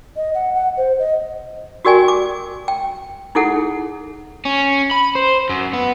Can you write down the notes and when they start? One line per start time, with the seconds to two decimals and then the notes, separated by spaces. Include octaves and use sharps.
0.16 D#5
0.34 F#5
0.54 F#5
0.77 C5
0.99 D#5
1.85 F#4 G4 A#4 D5 G5 G#5
2.08 D6
2.68 G5
3.35 D#4 E4 G#4 A4 F#5
4.45 C#4
4.91 B5
5.15 C5
5.49 F#2
5.73 B3